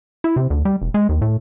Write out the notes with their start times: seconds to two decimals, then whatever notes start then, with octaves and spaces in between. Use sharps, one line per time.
0.24 E4
0.36 C3
0.50 D2
0.65 G3
0.82 E1
0.94 G#3
1.09 D#2
1.22 A2